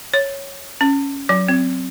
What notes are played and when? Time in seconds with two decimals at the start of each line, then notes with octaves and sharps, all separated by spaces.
0.14 C#5
0.81 C#4
1.29 F#3
1.49 C4